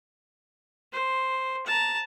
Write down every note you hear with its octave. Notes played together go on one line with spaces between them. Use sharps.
C5
A5 A#5